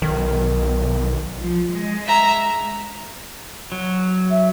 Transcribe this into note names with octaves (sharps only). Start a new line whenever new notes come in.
B1 D#3
F3
G#3
E5 A#5
F#3
E5